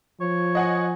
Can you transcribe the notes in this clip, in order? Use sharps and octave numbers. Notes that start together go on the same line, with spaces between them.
F3 C#5
D#5 F#5 G#5